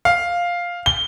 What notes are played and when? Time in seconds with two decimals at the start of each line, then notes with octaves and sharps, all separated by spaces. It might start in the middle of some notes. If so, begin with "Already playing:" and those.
0.05 F5
0.86 G7